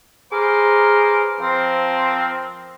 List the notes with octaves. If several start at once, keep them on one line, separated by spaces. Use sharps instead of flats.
G#4 B4 C5 A#5 D6 F6
F3 C4 A#4